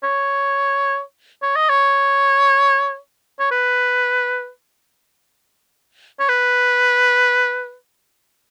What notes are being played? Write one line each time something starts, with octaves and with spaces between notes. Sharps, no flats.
C#5
C#5
D#5
C#5
C#5
B4
C#5
B4